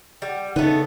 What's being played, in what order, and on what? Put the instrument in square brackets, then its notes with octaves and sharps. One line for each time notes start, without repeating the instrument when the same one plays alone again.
[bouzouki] G3 [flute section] F#5 G5
[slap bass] C#3 [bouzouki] A3 B3 [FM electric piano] D#4 [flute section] B4